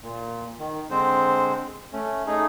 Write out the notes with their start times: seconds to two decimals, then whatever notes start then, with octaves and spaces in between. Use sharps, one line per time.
0.03 A#2
0.59 D#3
0.90 D3 G#3 C4 C5
1.93 A3 C#4
2.27 A3 D#4 G#4